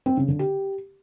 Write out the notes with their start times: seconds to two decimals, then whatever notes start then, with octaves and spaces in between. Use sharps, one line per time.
0.06 C4
0.17 C#3
0.28 D3
0.39 G4